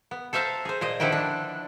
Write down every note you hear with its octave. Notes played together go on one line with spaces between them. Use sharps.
B3
A4 C5 E5 F5 A5 A#5
G#4 C5
A#2 C5 D#5
D3 D#3 F3 E4 B4 G5
D4